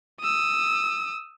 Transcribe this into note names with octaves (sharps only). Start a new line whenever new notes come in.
D#6 E6